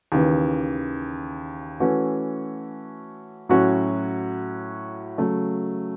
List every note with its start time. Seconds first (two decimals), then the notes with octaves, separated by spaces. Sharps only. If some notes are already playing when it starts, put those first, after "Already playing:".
0.12 D#2 C#3 E3
1.80 E3 A3 C#4 F#4
3.49 A2 F#3 C#4 F#4
5.18 C#3 F#3 A3